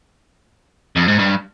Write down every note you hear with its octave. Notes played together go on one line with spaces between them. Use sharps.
F2
G#2
G2